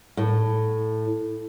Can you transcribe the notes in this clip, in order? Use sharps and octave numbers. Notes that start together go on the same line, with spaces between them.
A2